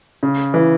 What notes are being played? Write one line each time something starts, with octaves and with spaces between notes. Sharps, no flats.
C#3
E3